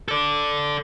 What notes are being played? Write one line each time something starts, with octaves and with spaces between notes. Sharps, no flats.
A4 D5